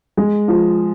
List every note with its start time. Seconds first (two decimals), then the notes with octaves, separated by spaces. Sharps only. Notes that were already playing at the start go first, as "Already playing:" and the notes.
0.17 G#3
0.48 F3